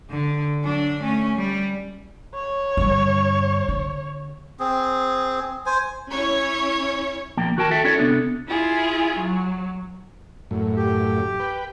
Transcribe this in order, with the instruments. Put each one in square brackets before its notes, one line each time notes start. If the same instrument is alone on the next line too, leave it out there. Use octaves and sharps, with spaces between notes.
[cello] D3
F#3 D4
A3 C#4
G3
[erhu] C#5
[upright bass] G2 D3
D3
[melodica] C4 G#4
C5 G#5
[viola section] C#4 E4 C#5
[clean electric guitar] A#2 F3 A#3 G5
D#2 F#4 A#4 G5 A5
F#4 A4 E5 G5
C#4 E4 F#4 A4 C#5 D5
C3 B3 D4 A4
[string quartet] E4 F4 G#4
F#3
[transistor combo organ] F#2 A2
[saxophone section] G4
[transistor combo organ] B4 G5